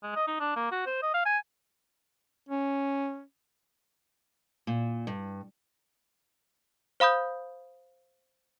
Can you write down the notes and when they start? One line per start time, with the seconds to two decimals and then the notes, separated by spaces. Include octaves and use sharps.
0.03 G#3
0.16 D#5
0.27 D#4
0.40 D4
0.56 A#3
0.71 F#4
0.86 C5
1.02 D#5
1.14 F5
1.26 G#5
2.49 C#4
4.67 A#2
5.07 G2
7.00 C5 F5 B5 D#6 G6